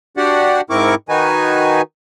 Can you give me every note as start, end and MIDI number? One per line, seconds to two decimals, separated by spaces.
0.17 0.61 62
0.17 0.61 66
0.17 0.61 67
0.17 0.61 74
0.17 0.61 78
0.70 0.95 44
0.70 0.95 60
0.70 0.95 64
0.70 0.95 70
0.70 0.95 85
0.70 0.95 86
1.09 1.82 51
1.09 1.82 63
1.09 1.82 66
1.09 1.82 71
1.09 1.82 80